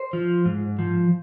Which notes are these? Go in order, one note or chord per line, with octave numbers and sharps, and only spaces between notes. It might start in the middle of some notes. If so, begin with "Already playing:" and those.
Already playing: C5
F3
G#2
F3